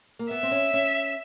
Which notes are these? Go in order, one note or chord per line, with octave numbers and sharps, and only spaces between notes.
A#3
B3 E5
C4
C#4
C#4